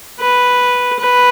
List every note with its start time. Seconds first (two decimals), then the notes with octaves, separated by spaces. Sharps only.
0.20 B4
0.99 B4